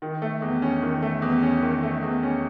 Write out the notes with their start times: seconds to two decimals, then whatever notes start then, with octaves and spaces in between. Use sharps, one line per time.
0.02 D#3
0.22 A3
0.42 E2
0.62 C#4
0.82 D#3
1.02 A3
1.22 E2
1.43 C#4
1.62 D#3
1.83 A3
2.02 E2
2.23 C#4